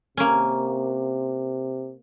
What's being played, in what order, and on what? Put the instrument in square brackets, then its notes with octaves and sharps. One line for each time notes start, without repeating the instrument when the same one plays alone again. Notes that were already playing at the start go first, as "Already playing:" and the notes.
[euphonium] C3 [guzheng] A#3 C#4